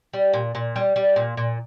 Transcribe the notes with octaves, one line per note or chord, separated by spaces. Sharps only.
G3
A#2
A#2
G3
G3
A#2
A#2